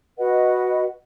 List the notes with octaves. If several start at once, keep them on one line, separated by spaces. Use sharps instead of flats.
F#4 B4 D#5 F#5